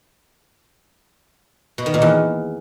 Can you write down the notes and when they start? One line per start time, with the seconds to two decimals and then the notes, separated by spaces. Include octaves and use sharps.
1.78 B2
1.86 D#3
1.94 A#2
2.02 E2